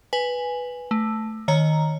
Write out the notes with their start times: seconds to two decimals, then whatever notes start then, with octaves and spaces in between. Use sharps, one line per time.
0.13 B4 G#5
0.91 A3
1.48 D#3 C#5 A#5